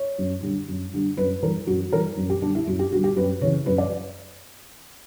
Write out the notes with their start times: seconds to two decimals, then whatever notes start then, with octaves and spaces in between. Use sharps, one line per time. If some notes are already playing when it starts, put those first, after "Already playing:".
Already playing: C#5
0.18 F#2
0.42 D3 G3
0.68 F#2
0.93 D3 G3
1.17 F#2 B4
1.43 E3 G3 A#4
1.67 F#2 F#4
1.93 E3 G3 A#4
2.17 F#2
2.30 G4
2.42 D3 G3 D4
2.55 E4
2.67 F#2 F#4
2.79 G4
2.91 D3 F#4
2.96 G3
3.04 G4
3.16 F#2 B4
3.41 C#3 C#5
3.45 E3
3.66 F#2 B4
3.78 D5